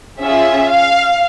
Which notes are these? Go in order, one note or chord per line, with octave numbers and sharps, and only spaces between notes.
C#4 F4 G#4 E5
F5